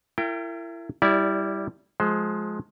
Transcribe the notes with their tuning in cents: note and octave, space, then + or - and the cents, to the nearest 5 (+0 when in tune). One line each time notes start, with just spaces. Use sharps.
E4 +30 A#4 -40 G5 +0
G3 +0 E4 -15 D5 -25
F3 +20 G#3 +20 C5 +0